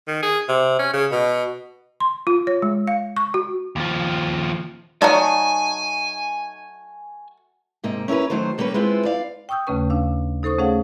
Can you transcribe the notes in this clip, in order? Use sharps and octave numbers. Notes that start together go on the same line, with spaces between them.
D#3
G#4
C3
C#4
C#3
B2
C6
F4
C#5
G#3
F5
C#6
F#4
D#2 F3
F#3 A3 D#4 D5 G#5 A5
G#2 C3 A#3 D#5
C#4 E4 G#4 A#4 B4
D#3 F#3 A3 C5
G3 A#3 B3 C#4 B4
G#3 B3 C4 E4 F4
D5 F5
G5 C#6 D#6 E6 G6
D#2 C#3 A3 C#4 B4 C#6
D4 F5 E6
D#4 A4 C5 C#6 D#6
A3 C#4 G#4 C#5 F5 F#5